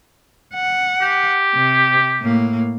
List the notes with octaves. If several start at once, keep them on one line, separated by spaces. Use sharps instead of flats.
F#5
G4
C3
A2 A#3